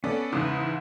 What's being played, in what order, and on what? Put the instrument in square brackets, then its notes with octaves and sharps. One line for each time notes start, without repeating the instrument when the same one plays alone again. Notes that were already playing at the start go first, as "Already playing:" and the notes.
[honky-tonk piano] B3 A4 D5 [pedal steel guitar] C#4
[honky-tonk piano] E2 G#2 C#3 [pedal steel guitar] E4 D#6